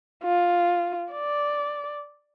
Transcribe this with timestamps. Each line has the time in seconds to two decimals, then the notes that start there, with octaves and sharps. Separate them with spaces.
0.24 F4
1.12 D5